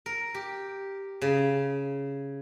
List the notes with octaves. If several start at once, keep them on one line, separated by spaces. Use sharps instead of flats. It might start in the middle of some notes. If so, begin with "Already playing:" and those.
A#4
G4
C#3